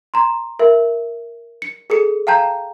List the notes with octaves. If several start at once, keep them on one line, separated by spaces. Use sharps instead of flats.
A#5 C6
A#4 E5
C#7
G#4 A4 C#7
F5 G5 A5 A#5 G6